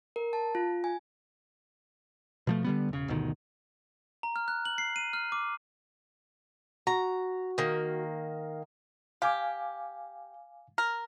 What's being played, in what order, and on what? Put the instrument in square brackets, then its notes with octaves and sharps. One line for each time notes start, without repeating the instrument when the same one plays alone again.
[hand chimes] A#4
A5
F4
G#5
[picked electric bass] B2 F3 A3
D3 G3 B3
E1 C#3
G1 D2 B2 D#3
[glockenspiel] A#5
F6
F#6
F#7
C7
D#7
F6
D6
[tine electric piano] F#4 [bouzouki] A#5
[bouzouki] D#3 A#3
[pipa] G4 [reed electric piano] F5 G#5 D6
[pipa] A#4